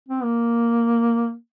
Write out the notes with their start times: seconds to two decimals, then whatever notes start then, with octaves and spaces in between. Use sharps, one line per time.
0.08 C4
0.23 A#3